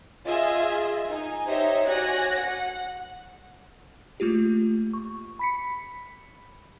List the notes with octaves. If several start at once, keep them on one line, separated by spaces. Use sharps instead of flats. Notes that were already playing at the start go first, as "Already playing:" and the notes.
F4 G#4 D#5 E5
D#4 G#5
D#4 G4 C5 C#5 D#5 E5
F#4 C#5 D5 G#5 F#6 A#6
F#5
A3 A#3 F4 G4
C#6
B5 B6 C#7